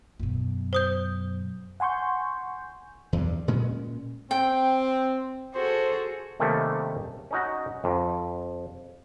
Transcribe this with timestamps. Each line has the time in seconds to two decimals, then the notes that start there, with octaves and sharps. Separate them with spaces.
0.20 F#2 B2
0.73 C5 D#6 G6
1.80 F#5 G#5 C6 C#6 G6
3.13 E2 G2
3.48 A#2 G#3 C#4
4.31 C4 G5
5.55 F#4 G#4 A4 C5
6.40 C3 D#3 G3 A3 A#3 C#4
7.31 C#4 D#4 F#4
7.84 F2